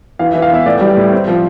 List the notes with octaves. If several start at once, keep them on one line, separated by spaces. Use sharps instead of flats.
E3 F5
E5
E3
F5
B3 E5
A2 D5
G3
A2
C4
F3